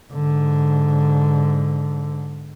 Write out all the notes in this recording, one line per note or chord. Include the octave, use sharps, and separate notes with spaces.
G#2 D3